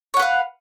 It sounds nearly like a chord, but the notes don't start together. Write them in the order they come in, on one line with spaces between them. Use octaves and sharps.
C#5 F#5 B4 F5